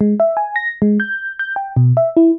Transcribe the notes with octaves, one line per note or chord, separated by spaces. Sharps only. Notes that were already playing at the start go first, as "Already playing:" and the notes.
G#3
E5
G#5
A#6
G#3
G6
G6
G5
B2
E5
E4